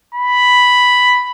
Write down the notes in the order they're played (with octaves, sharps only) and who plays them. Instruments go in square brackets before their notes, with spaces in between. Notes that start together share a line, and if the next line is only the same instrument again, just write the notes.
[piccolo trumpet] B5